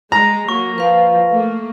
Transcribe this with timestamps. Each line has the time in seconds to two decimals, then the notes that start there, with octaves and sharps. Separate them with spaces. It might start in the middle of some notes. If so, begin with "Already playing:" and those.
0.12 G#3 A#5 A#6
0.49 F#3 A#3 C#6
0.78 F3 B4 F5
1.29 A3 A#3